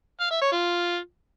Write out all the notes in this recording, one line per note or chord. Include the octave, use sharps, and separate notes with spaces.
F5
E5
C#5
F4